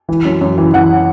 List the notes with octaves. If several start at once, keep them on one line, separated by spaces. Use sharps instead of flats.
E3
F#2
F#2
E3
E3 F#5